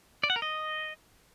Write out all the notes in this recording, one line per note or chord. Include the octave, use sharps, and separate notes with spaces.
D5
F#5
A#4
D#5